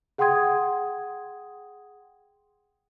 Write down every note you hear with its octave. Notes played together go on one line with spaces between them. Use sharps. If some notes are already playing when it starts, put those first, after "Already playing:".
G#4 F#5 G5 C6 D#6 G#6